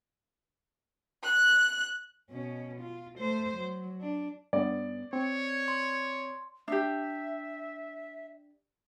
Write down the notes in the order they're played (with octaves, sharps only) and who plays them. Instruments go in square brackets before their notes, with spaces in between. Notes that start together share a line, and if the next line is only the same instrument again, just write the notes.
[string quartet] F#6
[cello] B2 C#4
F4
A3 C5
F#3
D4
[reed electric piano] G2 B3 C#4 [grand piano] D5
[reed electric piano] C4 [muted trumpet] C#5
[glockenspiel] C6
[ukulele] D4 G4 [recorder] E5